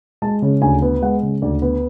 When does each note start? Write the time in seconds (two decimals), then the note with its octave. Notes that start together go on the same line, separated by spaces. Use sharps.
0.22 G#3 A5
0.42 C#3
0.62 D2 G#5
0.82 B3
1.02 G#3 F#5
1.22 C#3
1.42 D2 D5
1.62 B3